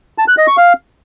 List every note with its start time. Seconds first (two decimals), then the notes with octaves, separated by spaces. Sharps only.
0.18 A5
0.28 F#6
0.38 D#5
0.47 C#6
0.57 F5